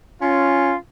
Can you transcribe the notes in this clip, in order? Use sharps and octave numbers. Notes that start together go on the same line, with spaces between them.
C#4 F4